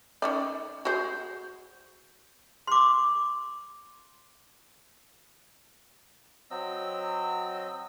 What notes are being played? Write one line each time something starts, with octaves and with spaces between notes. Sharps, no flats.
D#3 C#4 D5
F#4 G#4 C5
C6 D6
F#3 C4 D#5 E6